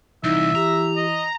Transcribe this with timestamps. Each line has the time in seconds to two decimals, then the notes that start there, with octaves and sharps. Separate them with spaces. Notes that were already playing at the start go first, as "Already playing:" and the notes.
0.24 C2 E3 D#4 E5
0.55 G4 A#5
0.97 D#5